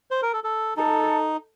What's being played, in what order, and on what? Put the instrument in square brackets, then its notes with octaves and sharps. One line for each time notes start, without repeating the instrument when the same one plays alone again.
[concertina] C5
A#4
A4
A4
[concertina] D#4 [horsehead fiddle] A4